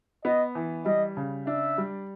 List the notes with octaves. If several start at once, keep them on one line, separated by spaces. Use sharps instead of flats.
B3 D#5
E3
G3 D#5
C#3
D4 E5
G3